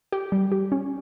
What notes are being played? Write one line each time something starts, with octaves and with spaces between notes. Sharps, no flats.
G4
G3
G4
C#4